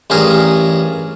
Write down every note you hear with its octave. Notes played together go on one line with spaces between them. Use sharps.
A1 G2 G#4 A#4